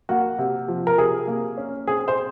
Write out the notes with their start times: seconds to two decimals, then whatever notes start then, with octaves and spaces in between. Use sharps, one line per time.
0.09 A#3 F#4
0.38 C3
0.68 F3
0.87 A#4
0.98 C3 G#4
1.27 A#3
1.57 C#4
1.87 C4 G#4
2.08 C5